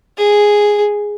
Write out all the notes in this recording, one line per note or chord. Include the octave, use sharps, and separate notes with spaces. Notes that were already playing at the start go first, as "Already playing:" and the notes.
G#4